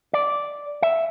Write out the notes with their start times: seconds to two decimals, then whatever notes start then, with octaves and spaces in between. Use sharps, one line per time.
0.13 D5
0.82 E5